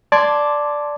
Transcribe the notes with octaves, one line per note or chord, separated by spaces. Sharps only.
D5 A5 C6 D6 G#6